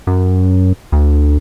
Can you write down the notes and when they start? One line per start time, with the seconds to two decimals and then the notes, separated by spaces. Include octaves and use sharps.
0.07 F#2
0.92 D2